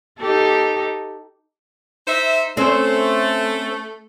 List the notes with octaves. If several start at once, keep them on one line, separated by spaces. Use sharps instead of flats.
D#4 G4 A4
D#4 C5 E5
A3 C4 C#4 C5